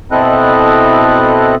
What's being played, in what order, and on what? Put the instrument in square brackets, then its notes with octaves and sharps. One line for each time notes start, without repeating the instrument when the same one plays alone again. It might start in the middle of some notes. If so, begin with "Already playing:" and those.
[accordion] B2 C4 E4 A4 D#5 F#6